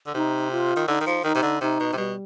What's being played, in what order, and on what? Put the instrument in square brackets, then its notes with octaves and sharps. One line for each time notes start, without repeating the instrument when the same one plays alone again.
[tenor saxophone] D3
[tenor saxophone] C3 [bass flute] D#4
[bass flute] F4
[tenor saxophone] D#3
[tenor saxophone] D3 [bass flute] D#4
[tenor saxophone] D#3
F3
[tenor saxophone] D#3 [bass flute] D#4
[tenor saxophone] C3
D3
[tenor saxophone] C3 [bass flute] D#4
[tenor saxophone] B2
C3
[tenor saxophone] B2 [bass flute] G3